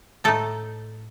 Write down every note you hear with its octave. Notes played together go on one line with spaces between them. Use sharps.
A2 A3 D#4 A4